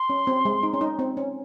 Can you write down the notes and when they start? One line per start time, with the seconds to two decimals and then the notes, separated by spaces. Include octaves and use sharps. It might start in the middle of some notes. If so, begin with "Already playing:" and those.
Already playing: C6
0.10 C#4
0.27 C4
0.45 G#3
0.63 D#4
0.73 C#4
0.81 D#4
0.99 C4
1.17 C#4